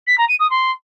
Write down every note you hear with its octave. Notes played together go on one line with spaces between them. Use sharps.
B6
A#5
D#7
D#6
C6